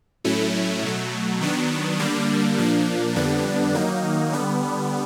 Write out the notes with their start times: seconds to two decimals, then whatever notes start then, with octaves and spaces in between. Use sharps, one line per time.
0.24 A2 F#3 A3 C#4 E4
0.83 B2 F#3 A3
1.41 D#3 F#3 B3 D4
1.99 D3 G3 A#3 D4
2.57 A#2 F3 A#3 D4
3.16 F2 D3 G3 B3 D4
3.74 D#3 F#3 A#3 D#4
4.32 D3 G3 B3